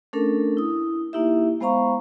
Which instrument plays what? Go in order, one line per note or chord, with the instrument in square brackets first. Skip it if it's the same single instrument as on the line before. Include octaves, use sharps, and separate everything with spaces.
[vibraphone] A3 C#4 D4 A4 A#4
E4 D#6
A#3 D#4 E4 G4 E5
G#3 B3 C5 F5 A#5 C#6